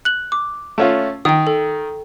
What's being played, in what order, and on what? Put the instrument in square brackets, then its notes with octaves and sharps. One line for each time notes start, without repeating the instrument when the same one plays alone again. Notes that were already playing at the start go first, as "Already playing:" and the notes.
[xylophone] F#6 F#7
D6
[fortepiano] A3 C#4 F4
[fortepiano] D#3 [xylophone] G5 D#6
[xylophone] A4